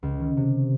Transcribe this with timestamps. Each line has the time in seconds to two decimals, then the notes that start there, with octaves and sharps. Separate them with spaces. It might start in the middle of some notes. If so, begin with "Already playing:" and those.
0.03 C#2
0.20 D#3
0.37 C3